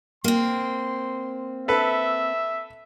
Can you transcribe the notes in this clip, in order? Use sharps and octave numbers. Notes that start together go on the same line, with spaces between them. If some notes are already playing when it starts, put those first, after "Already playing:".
A#3 C4 C6
A4 B4 E5